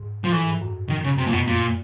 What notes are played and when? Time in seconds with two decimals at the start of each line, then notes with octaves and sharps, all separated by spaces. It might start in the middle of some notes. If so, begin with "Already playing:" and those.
Already playing: G#2
0.24 F3
0.32 A2 E3
0.46 G#2
0.62 F#2
0.89 D#3
1.04 C#3
1.18 F#2 C3
1.27 F2 A#2
1.33 F#2 B2
1.47 F#2 A#2